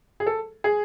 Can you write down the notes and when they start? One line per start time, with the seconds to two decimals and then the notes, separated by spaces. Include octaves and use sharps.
0.20 G#4
0.26 A4
0.64 G#4